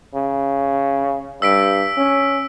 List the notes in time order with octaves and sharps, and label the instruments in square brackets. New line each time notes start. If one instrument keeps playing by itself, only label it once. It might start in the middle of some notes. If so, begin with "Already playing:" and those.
[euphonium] C#3
[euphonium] G2 [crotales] E6 B6 D7
[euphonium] C#4